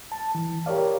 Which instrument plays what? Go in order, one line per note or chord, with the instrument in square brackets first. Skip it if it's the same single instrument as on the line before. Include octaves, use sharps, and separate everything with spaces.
[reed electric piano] A5
E3
G4 A#4 C#5 D5 F5